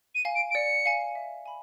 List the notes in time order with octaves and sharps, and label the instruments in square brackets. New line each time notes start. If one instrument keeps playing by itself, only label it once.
[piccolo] D#7
[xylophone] F5 G#5
[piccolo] D7
D7
[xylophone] D5 [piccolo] C#7
[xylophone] F5 G#5
E5
G#5 B5